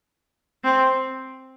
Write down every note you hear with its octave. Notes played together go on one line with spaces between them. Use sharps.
C4